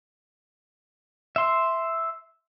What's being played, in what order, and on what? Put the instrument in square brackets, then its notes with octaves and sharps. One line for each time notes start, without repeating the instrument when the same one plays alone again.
[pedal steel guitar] E5 C6